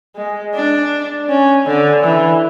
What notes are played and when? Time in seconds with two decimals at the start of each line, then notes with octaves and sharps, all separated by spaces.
0.16 G#3
0.54 D4
1.29 C#4
1.67 D3
2.04 E3